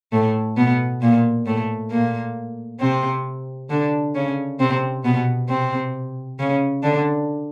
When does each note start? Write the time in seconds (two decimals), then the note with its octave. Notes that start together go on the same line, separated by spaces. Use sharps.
0.12 A2 A3
0.57 B2 B3
1.02 A#2 A#3
1.46 A2 A3
1.91 A#2 A#3
2.80 C3 C4
3.70 D3 D4
4.15 C#3 C#4
4.60 C3 C4
5.04 B2 B3
5.49 C3 C4
6.39 C#3 C#4
6.83 D3 D4